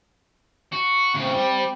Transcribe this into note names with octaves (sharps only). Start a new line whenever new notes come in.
F#4
A2 C#3 C4
G3